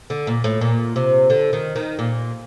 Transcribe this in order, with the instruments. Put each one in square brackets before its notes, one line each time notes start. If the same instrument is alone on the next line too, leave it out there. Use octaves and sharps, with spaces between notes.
[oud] D3
A#2
A2
A#2
C3
D3
D#3
D#3
A#2